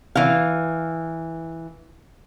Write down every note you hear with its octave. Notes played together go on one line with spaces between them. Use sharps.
E3 F5